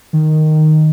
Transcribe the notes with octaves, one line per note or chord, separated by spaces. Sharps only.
D#3